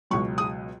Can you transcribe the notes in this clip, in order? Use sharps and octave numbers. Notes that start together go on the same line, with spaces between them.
C#2 B2 F#3 C#6
D#6